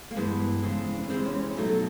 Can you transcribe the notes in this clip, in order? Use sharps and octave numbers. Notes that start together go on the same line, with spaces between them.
A#3
G2 E3 G#3 B3
F2 C#3 E3 G#3
D4
C#4
E2 C3 E3 G#3 C4
C#4
C#4
B2 F#3 A3 D#4
A4